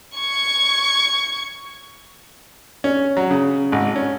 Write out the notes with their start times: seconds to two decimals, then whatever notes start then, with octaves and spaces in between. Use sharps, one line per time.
0.17 C#6 G#6
2.84 C#4
3.17 F#3
3.31 C#3
3.72 G#1
3.96 C#4